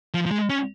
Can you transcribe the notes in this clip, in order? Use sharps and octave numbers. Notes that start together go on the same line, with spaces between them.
F3
F3
G#3
C#4